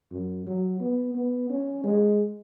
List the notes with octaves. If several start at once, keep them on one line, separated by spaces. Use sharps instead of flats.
F#2
F#3
B3
B3
C#4
G#3